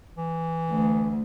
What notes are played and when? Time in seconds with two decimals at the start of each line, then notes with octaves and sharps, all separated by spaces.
0.17 E3
0.69 D2